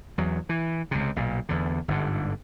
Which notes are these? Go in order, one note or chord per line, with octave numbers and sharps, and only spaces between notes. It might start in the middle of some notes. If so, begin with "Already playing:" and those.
E2 F#3
E3
C#2 C3
B1 A#2
E2 D3
G1 G#2 D3